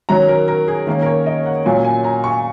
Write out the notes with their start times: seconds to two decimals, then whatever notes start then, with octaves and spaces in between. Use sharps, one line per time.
0.09 D#3 F#3 C#4 A#5
0.28 A#4
0.48 A#4
0.68 G#4
0.87 D#3 A#3 C#4 A#4
1.02 A#4
1.06 C#5
1.26 D#5
1.46 F#5
1.66 A#2 F#3 C#4 G#5
1.85 G#5
2.04 A#5
2.24 C#6